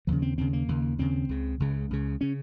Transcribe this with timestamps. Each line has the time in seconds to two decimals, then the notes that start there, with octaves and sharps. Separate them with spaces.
0.07 D#2 C#3 F3
0.22 C4
0.38 D#2 C#3 C4
0.53 A#3
0.68 D#2 C#3
0.98 D#2 C#3 C4
1.29 C#2 C#3
1.60 C#2 C#3
1.91 C#2 C#3
2.21 C#3 C#4